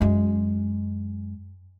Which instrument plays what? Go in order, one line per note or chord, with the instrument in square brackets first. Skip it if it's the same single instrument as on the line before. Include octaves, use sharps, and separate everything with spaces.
[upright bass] F#2 G#3